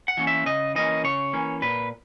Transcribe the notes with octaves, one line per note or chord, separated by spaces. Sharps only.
F#5
E3 A#3 C#4
E5
C#3 D#5
E3 A#3 C#4 D#5
C#3 C#5
E3 A#3 C#4
A#2 B4